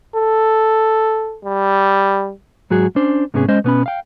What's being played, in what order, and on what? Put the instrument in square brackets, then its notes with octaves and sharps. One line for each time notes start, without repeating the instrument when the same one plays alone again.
[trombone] A4
G3
[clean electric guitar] G#2 F#3 F#4 G#4
C#4 D4 C5
G#2 C3 B3 C#4 G#4
G#3 C#4 C5 D#5
B2 B3 C#4 B5
F5 G5